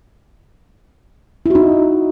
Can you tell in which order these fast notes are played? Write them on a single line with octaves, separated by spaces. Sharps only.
E4 F#4 D#4